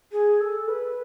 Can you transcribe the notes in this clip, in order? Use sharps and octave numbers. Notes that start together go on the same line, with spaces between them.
G#4
A4
B4